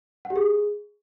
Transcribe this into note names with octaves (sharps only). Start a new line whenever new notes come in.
F#5
G4
G#4